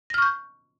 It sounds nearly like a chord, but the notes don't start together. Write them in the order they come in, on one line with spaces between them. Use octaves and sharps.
A#6 F6 C#6 G6